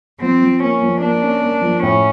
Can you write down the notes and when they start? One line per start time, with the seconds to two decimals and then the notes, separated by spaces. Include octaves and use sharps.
0.21 F3 C4
0.41 F3
0.62 A#3 C#4
0.82 F3
1.01 A#3 D4
1.22 C#4
1.41 A#3
1.62 F3
1.81 A2 C#4